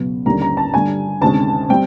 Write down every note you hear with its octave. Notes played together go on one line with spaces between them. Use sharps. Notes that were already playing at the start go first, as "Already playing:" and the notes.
Already playing: C#2 B2 F#3 B3
D#2 D3 G3 A#3 C#4 A#5
A#5
A5
G2 D3 G3 G#5
D2 C3 D#3 G#3 C#4 A5
G3 C4 G5